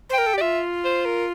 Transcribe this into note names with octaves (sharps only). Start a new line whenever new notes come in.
C5
A#4 G5
A4
G4
D5
F4 E5
C5
A#4